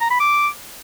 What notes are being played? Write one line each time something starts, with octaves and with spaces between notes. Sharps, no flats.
A#5
B5
D6